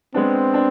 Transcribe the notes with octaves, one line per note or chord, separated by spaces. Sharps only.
G#3 B3 C4 D4
D4